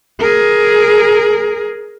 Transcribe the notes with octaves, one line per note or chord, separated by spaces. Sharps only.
G#4 A#4